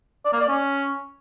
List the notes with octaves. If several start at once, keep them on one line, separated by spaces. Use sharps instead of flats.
D5
A#3
D5
C#4